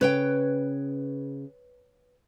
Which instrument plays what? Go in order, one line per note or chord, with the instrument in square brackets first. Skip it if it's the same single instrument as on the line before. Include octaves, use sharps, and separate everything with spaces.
[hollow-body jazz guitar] C#3 [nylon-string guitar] B4 C#5 G5